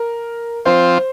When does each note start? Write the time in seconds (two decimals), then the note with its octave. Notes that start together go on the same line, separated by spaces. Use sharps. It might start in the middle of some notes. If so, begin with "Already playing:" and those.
Already playing: A#4
0.65 F3 C4 F4 C5